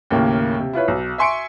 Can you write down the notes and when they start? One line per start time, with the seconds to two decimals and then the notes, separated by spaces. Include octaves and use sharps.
0.11 D#2 A2 C#3 A#3
0.60 C3
0.73 E4 F4 B4 C#5
0.88 B1
1.18 E5 G#5 C6 C#6 C#7 D7